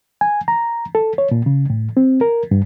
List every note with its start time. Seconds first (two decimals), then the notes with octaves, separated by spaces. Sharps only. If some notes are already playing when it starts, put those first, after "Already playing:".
0.21 G#5
0.48 A#5
0.95 A4
1.18 C#5
1.31 A#2
1.46 C#3
1.70 A2
1.97 C4
2.21 A#4
2.51 G2